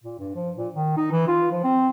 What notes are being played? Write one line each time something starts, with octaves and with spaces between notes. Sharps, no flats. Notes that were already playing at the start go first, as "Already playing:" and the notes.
A#2
G2
F3
A#2
D#3
D#4
E3
F4
F3
C4